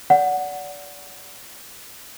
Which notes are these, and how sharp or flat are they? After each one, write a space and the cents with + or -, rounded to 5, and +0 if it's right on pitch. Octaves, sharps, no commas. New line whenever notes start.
D5 -30 F#5 +0